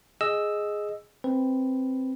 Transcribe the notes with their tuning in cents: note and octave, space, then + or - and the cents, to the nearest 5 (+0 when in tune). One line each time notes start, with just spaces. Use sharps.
G#4 +0 D#5 +0 E6 +0
C4 +0 B4 +0